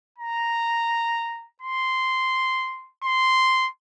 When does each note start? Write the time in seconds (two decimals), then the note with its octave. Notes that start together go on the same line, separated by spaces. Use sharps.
0.18 A#5
1.61 C6
3.04 C6